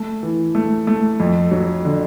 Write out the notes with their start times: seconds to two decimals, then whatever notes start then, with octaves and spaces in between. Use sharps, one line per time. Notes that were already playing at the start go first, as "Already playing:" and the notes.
Already playing: A3
0.23 E3
0.55 A3
0.87 A3
1.20 F2
1.51 F#3
1.85 D3